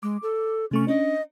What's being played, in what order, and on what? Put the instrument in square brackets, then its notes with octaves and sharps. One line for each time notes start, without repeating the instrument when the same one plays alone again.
[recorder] G#3 [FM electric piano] D6
[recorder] A4
[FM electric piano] C3 A3 C#6 [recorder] C#4
[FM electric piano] C#4 D4 [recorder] D#5